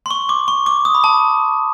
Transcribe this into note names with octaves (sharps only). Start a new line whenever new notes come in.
C6
C#6
D6
C#6
D6
D#6
B5
A5